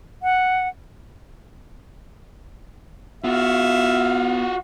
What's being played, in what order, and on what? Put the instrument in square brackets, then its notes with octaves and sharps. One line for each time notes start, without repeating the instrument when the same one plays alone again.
[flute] F#5
[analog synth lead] B3 [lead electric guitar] F4 F#4 [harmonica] E5 F5